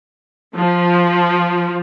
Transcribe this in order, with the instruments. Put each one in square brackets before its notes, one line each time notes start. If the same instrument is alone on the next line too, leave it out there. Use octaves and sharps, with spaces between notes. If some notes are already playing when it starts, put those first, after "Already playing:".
[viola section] F3